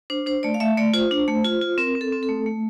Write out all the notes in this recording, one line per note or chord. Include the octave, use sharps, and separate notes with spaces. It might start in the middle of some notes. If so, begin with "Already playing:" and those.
D4 C5
D4 C5
A3 D5
F5
A3 E5
A3 D5
F4 C5
D4
A3
F4
F4
C4 A#4
C4
A4
C4
A4
A3
A3